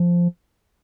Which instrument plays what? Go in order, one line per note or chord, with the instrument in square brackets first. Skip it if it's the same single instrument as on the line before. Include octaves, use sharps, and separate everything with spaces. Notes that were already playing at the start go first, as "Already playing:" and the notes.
Already playing: [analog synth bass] F3